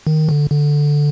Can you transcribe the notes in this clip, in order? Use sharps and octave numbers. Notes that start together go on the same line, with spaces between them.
D#3
D3
D3